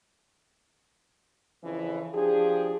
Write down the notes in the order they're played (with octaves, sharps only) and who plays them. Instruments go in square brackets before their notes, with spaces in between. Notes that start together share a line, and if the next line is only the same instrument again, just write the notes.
[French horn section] F2 C#3 E3
F3 D4 G4 G#4